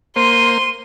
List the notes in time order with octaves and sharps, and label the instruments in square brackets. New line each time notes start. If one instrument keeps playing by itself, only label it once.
[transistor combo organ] A#3 C5 [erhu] C6 [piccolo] D#7